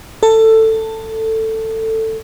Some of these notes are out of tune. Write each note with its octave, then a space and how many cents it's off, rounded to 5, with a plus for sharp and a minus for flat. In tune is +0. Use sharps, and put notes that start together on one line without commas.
A4 +15